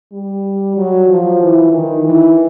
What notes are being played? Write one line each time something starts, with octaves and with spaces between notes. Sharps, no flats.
G3
F#3
F3
E3
D#3
E3